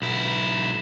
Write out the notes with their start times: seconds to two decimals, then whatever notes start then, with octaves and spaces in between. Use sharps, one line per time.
0.02 B1 E4